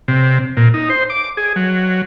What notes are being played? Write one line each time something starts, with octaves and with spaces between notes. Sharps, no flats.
C3
A#2
D#4
C5
D6
G#4
F#3